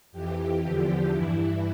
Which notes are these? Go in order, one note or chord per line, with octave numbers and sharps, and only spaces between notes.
F2 E3 G4
E2 D3 F3
G2 E3 E4